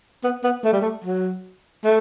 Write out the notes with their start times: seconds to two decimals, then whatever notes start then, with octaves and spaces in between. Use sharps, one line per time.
0.23 B3
0.44 B3
0.64 A3
0.73 G3
0.81 A3
1.04 F#3
1.84 A3